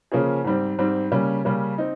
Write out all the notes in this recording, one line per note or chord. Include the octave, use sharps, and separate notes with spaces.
C#3 F3 A#3 C#4 G#4
G#2 G3 C4
G#2 G3 C4
C#3 G3 A#3 C#4
C#3 G3 A#3 C#4
C4 D#4